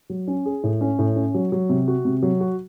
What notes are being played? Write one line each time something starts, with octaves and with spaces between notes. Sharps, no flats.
F#3
C#4
G#4
A2
C#4
A2
C#4
F#3
F#3
C3
F#4
C3
F#3
F#4